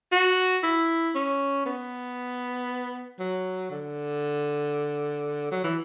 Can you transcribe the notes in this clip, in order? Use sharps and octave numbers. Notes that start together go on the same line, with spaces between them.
F#4
E4
C#4
B3
F#3
D3
F#3
E3